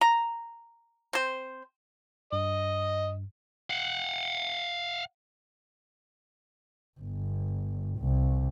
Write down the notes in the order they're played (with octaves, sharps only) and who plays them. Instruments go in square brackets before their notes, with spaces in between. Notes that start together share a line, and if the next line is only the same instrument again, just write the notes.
[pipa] A#5
C4 C5
[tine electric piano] G2 [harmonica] D#5
[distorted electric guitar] F5 F#5
[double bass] G1
C2